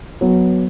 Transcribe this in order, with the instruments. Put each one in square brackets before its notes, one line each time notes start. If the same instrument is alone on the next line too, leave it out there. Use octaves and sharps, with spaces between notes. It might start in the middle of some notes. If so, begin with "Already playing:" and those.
[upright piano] F#3 B3